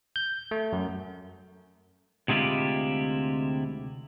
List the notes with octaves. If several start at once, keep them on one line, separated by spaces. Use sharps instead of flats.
G6
A3
F#2
D2 C3 G#3 E4 F4 G4